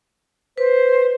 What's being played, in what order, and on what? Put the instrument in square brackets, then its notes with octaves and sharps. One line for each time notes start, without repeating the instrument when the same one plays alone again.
[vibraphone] B4 [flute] C5